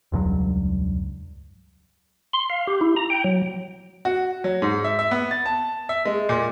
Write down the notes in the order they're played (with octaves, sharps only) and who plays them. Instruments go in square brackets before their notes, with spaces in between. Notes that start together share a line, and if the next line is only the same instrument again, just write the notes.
[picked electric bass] E1 C#2 G2 F#3
[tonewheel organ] C6
F5
G4
E4
A#5
G5
F#3
[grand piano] F#4
F#3
G#2
E5
E5
B3
A6
A5
E5
G#3
A#2